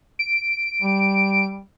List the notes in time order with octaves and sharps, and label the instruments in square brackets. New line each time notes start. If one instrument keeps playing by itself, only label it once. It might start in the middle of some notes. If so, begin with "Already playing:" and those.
[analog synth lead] D7
[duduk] G3